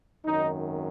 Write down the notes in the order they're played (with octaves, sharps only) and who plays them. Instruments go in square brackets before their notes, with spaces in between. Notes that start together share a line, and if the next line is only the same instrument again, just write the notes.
[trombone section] G#1 F#2 D#3 D#4